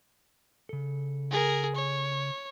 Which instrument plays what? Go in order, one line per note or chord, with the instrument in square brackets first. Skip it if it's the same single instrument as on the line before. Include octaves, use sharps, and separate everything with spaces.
[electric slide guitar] C#3 A4
[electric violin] G#4 A#4
C#5